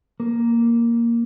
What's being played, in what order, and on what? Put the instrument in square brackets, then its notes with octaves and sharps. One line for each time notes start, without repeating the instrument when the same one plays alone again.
[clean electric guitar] A#3